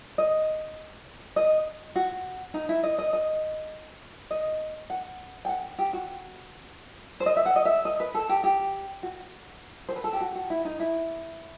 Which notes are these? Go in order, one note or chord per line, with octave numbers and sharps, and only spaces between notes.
D#5
D#5
F#4
D#4
E4
D#5
D#5
D#5
D#5
F#5
G5
F#5
G4
F#4
C5
D#5
E5
F#5
D#5
E5
D#5
B4
A4
G4
G4
F#4
C5
B4
A4
G4
F#4
F#4
E4
D#4
E4